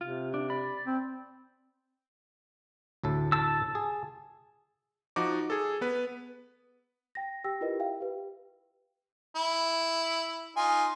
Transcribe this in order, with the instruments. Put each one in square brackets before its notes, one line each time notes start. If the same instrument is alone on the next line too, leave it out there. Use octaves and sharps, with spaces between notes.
[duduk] C3 [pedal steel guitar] F4
[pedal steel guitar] D4
D5 B5
[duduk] C4
[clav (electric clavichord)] D2 A2 A4
[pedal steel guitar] A5 E6
[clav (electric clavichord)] G#4
[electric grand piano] F3 D#4 F#4 D6
G#4 A4
B3 B4
[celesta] G5 A#6
G4 G5 E6 A#6
E4 F4 G4 A#4 B4 D#5
E5 F5 G5
G4 B4
[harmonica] E4
D#4 F4 G#5